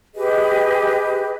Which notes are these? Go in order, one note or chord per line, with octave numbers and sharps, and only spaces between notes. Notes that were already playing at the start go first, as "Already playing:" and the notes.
G4 G#4 B4 D#5